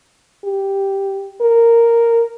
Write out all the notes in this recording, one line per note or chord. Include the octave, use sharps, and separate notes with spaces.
G4
A#4